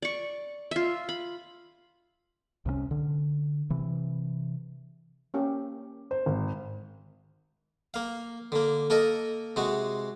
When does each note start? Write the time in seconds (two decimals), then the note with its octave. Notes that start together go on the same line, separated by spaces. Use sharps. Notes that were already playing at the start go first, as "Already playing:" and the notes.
0.02 D5 C#6
0.71 F4 E5
1.09 B5
2.65 C2 C3 F#3 C#4
2.91 D3
3.70 C3 E3
5.34 A#3 C#4 G4
6.11 C5
6.26 G#1
7.94 A#3 F5
8.52 D3 A#3
8.90 A#3 A4 A#4 D#5
9.56 C3 G#3 F#4